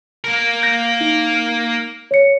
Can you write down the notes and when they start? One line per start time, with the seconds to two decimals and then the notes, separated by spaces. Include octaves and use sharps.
0.24 A#3 A#4
0.63 G6 A#6
1.01 D#4
2.11 C#5 C#7